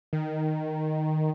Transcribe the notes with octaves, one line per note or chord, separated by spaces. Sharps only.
D#3